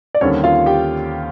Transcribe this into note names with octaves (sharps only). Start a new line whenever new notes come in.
D5
D#2 D3 G3 C4 C#4 C#5
F4 F5
G4 G5